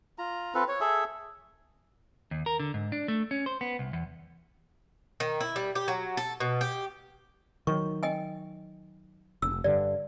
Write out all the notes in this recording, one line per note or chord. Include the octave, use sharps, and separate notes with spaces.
F4 A#5
C4 F4 A4 B4
C#5
G#4 A4 E5
D#2
A#4
D3
G#2
D4
A3
C#4
C5
B3
C2
E2
D#3
E4
G3
G4
F#3
A4
B2
G4
D#3 F#3 C#6
D#5 G5 G#5
F1 E6
G2 D3 D5